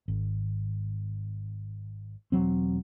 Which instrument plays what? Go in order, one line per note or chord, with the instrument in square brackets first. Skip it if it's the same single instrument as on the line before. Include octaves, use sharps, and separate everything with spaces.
[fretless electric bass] G#1
E1 F#3 C4